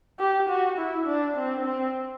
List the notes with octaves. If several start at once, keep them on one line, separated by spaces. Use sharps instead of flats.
G4
F#4
E4
D4
C4
C4